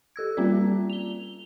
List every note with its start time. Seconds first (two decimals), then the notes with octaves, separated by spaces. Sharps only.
0.16 G4 A4 E6 G#6
0.37 G3 A#3 C4 C#4 F4 D5
0.90 F7 G7